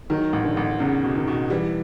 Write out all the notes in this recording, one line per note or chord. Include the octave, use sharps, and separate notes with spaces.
D#3 F#3
A1
D3
A1
E2 C#3
B2
D#3
B2
E3 G3